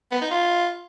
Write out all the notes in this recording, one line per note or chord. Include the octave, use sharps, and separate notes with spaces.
B3
D#4
F4